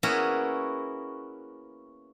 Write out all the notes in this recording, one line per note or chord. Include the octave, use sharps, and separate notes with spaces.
A#3 B3 C#4 E4 F#4 G#4